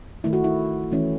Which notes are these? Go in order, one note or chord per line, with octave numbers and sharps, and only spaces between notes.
D#3 A3 E4
F#4
E4
E3 A3 C#4 E4